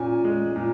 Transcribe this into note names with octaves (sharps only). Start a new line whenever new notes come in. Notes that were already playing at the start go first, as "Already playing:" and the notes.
Already playing: A#2 C#4 G#5
G#3
A#2